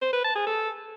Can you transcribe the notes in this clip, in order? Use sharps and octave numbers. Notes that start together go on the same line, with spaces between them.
C5
B4
A5
G#4
A4